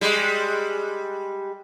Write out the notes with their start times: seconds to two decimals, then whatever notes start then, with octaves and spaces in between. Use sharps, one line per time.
0.01 G3 G#3